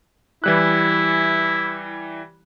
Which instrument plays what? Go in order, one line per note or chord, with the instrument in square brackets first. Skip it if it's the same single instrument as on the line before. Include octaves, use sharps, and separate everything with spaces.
[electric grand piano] E3 G3 F#6 [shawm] E4